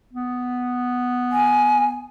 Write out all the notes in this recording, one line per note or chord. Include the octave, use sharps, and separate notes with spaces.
B3
G#5